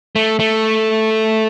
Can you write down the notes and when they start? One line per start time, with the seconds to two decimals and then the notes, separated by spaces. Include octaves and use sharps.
0.16 A3
0.40 A3